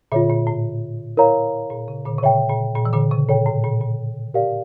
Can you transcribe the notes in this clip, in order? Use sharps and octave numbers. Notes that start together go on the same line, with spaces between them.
A#2 D3 F4 C#5 E5
A#2
A2
E4 A#4 C#5 F5 A#5
A#2
C#3
A#2 D3
C#3
A#2 C#5 E5 G5
A#2
A#2
E3
A#2 D3
C#3
A#2 A4 C#5 G5
A2
A#2
A#2
G4 A#4 D5 F5